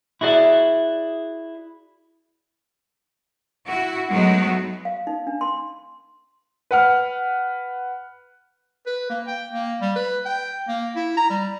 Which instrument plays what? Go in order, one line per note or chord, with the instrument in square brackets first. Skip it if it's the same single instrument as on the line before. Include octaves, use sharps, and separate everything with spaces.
[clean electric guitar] E4 F#4 G#4 D5 E5
[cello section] E4 F#4
F#3 G#3 A3 B3 D#4 F#4
[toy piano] F5
D#4
D4
C6
[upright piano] B4 F#5 F6
[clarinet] B4
A#3
G5
A#3
G3
B4
G5
A#3
E4
A#5
G3